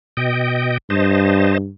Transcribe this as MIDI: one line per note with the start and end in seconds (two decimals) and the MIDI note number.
0.17 0.78 47
0.17 0.78 75
0.17 0.78 79
0.90 1.71 43
0.90 1.58 72
0.90 1.58 75
0.90 1.58 81